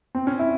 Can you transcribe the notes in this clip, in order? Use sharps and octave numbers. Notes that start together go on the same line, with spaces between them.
C4
C#4
E4